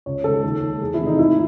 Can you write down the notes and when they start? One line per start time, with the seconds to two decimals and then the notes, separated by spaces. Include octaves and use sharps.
0.06 C#2 C#5
0.24 C#3 G#3 A4
0.43 D#2
0.62 D#3 G#3
0.81 E2 G#4
0.94 E4
1.00 C3 D#3 A3
1.07 D#4
1.19 G#2 E4